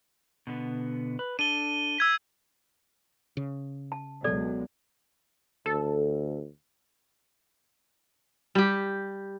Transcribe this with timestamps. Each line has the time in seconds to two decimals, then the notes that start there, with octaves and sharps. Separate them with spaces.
0.47 B2 D3 B3
1.19 B4
1.39 D4 A4 D#7 G7
1.98 E6 G#6 B6
3.37 C#3
3.92 A5
4.24 C#2 B2 F#3 G#3 A4 D5
5.66 D2 A4
8.55 G3 G4